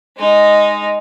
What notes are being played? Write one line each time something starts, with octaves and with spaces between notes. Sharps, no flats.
G#3 D#4